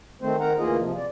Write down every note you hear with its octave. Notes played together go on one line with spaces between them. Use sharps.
D#3 A3 C4 C5
D#3 A#4 F#5 A#5
D2 E3 A#3 F4 G#4 D#5
C3 F3
D5